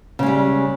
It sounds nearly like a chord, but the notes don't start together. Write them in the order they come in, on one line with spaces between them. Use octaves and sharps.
C#3 G#3 G3